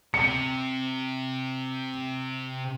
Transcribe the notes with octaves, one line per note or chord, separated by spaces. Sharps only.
C3 C#7